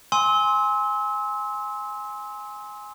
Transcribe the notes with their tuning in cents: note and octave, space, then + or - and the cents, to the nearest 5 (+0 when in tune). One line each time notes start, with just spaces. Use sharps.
G#5 -5 C6 +10 E6 -35